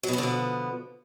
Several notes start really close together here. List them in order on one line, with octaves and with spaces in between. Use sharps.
F#3 B2 B3 D3 F3